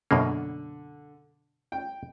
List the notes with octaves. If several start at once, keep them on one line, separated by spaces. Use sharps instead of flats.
F#2 B2 D3 A#3
G5